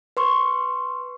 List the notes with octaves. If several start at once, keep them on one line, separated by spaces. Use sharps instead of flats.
B4 C6 C#6